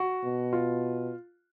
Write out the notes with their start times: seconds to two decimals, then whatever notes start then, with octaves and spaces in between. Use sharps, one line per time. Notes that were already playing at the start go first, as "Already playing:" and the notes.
Already playing: F#4
0.24 B2
0.53 F4